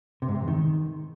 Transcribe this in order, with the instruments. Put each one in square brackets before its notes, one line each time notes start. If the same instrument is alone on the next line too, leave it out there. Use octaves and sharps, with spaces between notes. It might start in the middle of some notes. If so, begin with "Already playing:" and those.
[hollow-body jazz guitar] C3
G#2
C3
E2
D#3